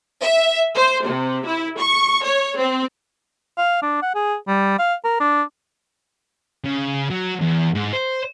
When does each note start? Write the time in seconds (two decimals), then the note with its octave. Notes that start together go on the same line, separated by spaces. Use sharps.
0.21 E5
0.75 C5
1.07 C3
1.46 E4
1.78 C#6
2.23 C#5
2.58 C4
3.58 F5
3.82 D4
4.02 F#5
4.15 G#4
4.48 G3
4.79 F5
5.05 A#4
5.20 D4
6.65 C#3
7.10 F#3
7.41 E2
7.75 G#2
7.93 C5